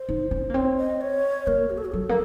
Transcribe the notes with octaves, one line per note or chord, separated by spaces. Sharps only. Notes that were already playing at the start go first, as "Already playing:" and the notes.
Already playing: C5
D#4
C#4
A#3
C4 C#5
D#5
C#5
A#3 A#4
F#4
A4
F#4
F#3 A4
A#3